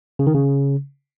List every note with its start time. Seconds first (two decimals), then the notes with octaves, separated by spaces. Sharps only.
0.19 C#3
0.27 D#3
0.34 C#3